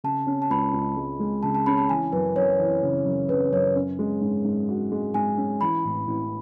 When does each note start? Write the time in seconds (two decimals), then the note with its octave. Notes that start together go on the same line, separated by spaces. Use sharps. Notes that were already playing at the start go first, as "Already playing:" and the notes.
0.04 C#3 A5
0.27 C#4
0.42 A5
0.50 C#2 B5
0.74 C#2
0.97 G#3
1.20 G#3
1.43 C#3 A5
1.55 A5
1.66 C#4 B5
1.77 A5
1.89 E3 G#5
2.13 F#2 B4
2.35 F#2 C#5
2.60 E3
2.83 C#3
3.05 F#2
3.29 C#3 B4
3.52 F#2 C#5
3.75 C#4
3.99 G#3
4.21 G#2
4.44 G#2
4.69 F#4
4.92 G#3
5.14 G#2 G#5
5.37 C#4
5.61 E3 B5
5.85 A1
6.07 A1